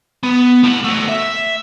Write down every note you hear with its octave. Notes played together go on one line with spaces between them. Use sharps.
B3
A2 F#5
A3 F#4
E5